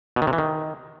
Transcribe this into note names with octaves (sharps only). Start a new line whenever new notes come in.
B2
D#3
C3
E3
D#3